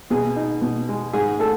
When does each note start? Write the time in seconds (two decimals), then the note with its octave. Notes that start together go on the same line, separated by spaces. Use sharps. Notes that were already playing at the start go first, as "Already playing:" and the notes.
0.10 B2 G#4
0.36 D#4
0.62 B2
0.89 G#3
1.13 G#2 G#4
1.39 A3 A4